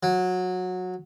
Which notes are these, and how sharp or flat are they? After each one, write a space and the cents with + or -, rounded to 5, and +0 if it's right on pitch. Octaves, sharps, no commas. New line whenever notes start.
F#3 -20